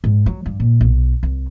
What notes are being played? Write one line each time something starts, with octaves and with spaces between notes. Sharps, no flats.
G#2
F#3
G2
A#2
B1
C2